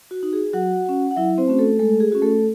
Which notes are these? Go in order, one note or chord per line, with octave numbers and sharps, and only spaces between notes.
F#4
D#4 F#4
G#4
F#3 F#4 F#5
C#4 F#4
F#5
F#3 E4 E5
C4 C5
A3 C#4 F#4
A3 A4
G#3 A3 A4
G#4
C#4 F#4
A3 A4